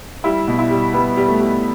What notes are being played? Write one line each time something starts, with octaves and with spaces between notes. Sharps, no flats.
G3 E4
B2
E4
G3
G3 B3
G3
A3
G3